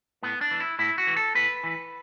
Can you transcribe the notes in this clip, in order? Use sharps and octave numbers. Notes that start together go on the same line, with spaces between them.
A2 B3
D4
E3
E4
A2 E4
F#4
E3
A4
A2 B4
E3